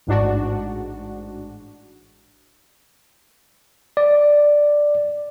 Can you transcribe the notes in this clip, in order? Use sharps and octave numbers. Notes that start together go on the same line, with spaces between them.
A1 G#2 D4 F#4
D5